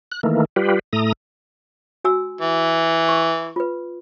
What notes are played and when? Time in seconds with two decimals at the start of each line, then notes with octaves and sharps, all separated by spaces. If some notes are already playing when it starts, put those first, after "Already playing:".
0.12 F#6
0.23 D#3 E3 A3 A#3
0.56 G3 F4 G4 B4
0.93 A2 A3 A#5 D#6
2.04 F#4 G#5 E6
2.41 E3
3.09 C#6
3.56 F4 B4